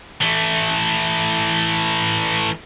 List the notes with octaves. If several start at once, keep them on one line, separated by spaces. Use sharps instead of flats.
E3 A3